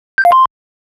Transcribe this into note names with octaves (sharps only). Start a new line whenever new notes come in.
G6
F5
C6